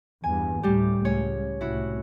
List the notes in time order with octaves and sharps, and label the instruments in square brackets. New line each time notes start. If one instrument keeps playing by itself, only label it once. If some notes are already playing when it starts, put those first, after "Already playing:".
[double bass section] E2 G2 [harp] G#5
[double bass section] D2 A2 A3 [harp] G3 G4
[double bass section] C#2 [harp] C#4 C#5
[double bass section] C2 A2 [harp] E4 F#4